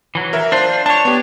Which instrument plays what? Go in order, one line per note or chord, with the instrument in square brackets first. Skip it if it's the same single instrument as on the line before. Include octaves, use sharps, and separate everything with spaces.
[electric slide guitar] E3 F#3
[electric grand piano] A#4 E5
[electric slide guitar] D4 F4 [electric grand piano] C5
[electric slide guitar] D4 C#5 [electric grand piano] A5
[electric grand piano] B3 G4